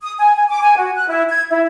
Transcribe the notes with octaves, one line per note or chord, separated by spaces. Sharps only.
D#6
G#5
G#5
D6
G#5
F#4
F#6
E4
G#6
E4